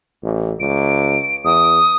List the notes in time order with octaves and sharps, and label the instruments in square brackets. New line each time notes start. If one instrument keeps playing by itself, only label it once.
[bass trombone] A1
[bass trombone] C#2 [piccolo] D7
[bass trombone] E2 [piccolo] D#6